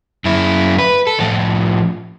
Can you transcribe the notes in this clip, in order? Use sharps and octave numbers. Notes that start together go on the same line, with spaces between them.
F#2 E4
B4
A4
A2 F3